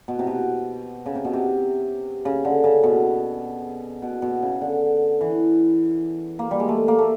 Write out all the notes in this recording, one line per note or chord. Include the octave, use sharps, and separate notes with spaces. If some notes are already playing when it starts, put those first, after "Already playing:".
B2
C3
B2
C#3
C3
B2
C3
C#3
D3
C#3
B2
B2
B2
C#3
D3
E3
A#3
G3
G#3
A3
A#3
A3